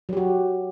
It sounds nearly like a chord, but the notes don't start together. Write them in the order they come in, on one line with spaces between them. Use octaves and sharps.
F#3 G4 F#4